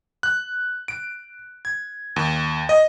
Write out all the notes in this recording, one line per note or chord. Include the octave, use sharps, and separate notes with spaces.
F#6
D7
G#6
D#2
D#5